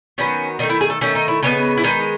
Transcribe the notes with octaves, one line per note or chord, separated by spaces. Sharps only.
D#3 F#3 B3 C#4
D#3 A3 D#4
E4
G#4
A4
D#3 A3 C#4
D#4
E4
C#3 G#3 B3 D#4
E4
D#3 G#3 B3 D#4